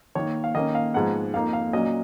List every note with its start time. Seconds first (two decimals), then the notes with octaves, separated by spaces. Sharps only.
0.15 D#3 A#3 D#4 C#5
0.44 F5
0.55 D#3 A#3 C#4 D#5
0.75 F5
0.94 G#2 F3 G#3 B3 D#4 F#5
1.34 F2 F3 A#3 D#4 F5
1.53 F5
1.73 A#2 F#3 C#4 D#5